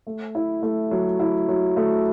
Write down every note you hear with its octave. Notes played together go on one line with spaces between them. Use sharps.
A3
E4
A3
F#3
E4
F#3
A3